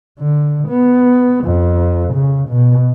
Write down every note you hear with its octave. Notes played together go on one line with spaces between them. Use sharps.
D3
B3
F2
C#3
B2